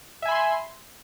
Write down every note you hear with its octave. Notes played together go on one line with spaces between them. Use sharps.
E5 G#5 B5 C6